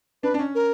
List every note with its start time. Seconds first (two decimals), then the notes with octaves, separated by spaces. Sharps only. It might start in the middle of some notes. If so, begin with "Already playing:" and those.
0.23 D4 B4
0.34 D4
0.39 C#4
0.55 A#4